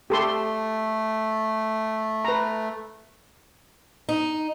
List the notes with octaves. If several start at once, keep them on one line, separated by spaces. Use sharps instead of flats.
A3 G4 A4 C6
B4 A#5
D#4